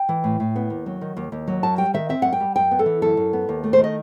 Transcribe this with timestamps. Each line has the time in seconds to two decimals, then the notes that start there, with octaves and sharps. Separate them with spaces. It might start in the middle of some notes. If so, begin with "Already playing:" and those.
Already playing: G5
0.09 E3
0.24 A2
0.40 A2
0.56 B3
0.70 D#2
0.86 F#3
1.01 D#3
1.17 D#2
1.32 D#2
1.48 F#3
1.63 F#2 A5
1.78 G3 G5
1.94 D#3 E5
2.09 C4 E5
2.22 F#2 F#5
2.33 G5
2.40 G3
2.56 F#2 G5
2.71 B3
2.79 A4
2.86 E3
3.02 F#2 A4
3.17 F#2
3.33 B3
3.49 D#2
3.64 A3
3.73 C5
3.79 D#3
3.84 D#5